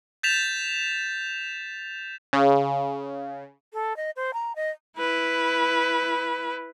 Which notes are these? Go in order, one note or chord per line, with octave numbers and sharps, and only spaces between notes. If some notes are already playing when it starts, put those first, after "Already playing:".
G6 A6 B6 E7 F7
C#3
A4
D#5
C5
A#5
D#5
E4 B4